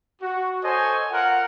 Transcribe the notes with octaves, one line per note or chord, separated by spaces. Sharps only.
F#4
A4 C5 C#5 D#5 G#5
F4 A#4 F#5